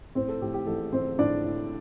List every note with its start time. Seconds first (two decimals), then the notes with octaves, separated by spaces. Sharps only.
0.15 A2 C4 C5
0.28 A4
0.42 A2 G4
0.54 G4
0.66 A1 A4
0.92 A1 C4 C5
1.18 A2 D4 D5
1.44 A2